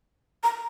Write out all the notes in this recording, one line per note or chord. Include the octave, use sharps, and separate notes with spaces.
A#5